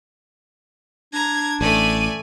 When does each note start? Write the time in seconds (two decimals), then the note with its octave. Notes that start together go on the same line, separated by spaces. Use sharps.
1.13 D4 A#5 G#6
1.61 A1 A3 D5 G#5 D#7